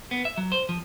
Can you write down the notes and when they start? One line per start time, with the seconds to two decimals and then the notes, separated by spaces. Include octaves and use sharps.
0.11 B3
0.25 E5
0.38 F#3
0.52 C5
0.69 F3